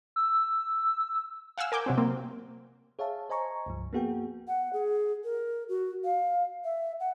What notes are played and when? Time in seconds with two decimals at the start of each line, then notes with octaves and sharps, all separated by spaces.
0.16 E6
1.58 F5 F#5 G#5 E6 F6
1.72 A#4 G#5 D6 G6
1.86 C3 F#3 C4
1.98 A#3 C4
2.99 G#4 C#5 E5 F5 A5
3.29 C5 D#5 G#5 A#5 C#6
3.66 C#2 G2 F3
3.93 A#3 B3 F#4 G#4 G5
4.48 F#5
4.73 G#4
5.24 A#4
5.69 F#4
6.04 F5
6.64 E5
7.00 F#5